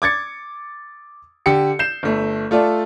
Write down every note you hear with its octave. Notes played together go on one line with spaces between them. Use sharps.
D6 G#6 A6 C#7
D3 G4 C#7
G6 C7 E7
G1 A3
A3 F4 A4 D5